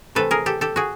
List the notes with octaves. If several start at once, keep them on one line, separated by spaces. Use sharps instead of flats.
C3 E3 A3 A4 B4
G#4 A#4
G4 A4
G4 A4
F#4 G#4